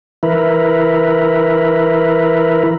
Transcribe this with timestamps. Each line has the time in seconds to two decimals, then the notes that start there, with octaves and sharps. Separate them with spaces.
0.23 E3 E4 A#4 B4